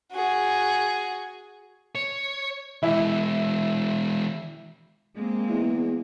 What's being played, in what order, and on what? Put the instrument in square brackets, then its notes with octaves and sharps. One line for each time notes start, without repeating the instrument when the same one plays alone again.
[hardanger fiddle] F#4 G#4
[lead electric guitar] C#5
[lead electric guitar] E3 G#3 [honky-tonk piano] E4 E5
[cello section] G#3 A#3 C4
[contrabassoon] E2